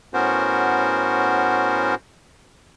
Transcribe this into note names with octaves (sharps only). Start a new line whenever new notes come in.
A2 B3 C#4 F#4 A#4 C5